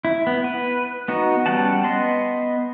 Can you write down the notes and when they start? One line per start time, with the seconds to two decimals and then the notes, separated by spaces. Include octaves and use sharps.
0.05 E4
0.27 B3
0.44 B4
1.08 B3 D#4 F#4
1.46 G3 B3 C#4 F#5 A5
1.84 B3 D#5 C6